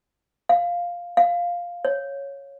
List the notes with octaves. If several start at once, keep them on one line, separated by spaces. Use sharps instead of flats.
F5
F5
C#5